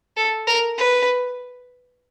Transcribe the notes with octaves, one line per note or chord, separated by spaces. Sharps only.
A4
A#4
B4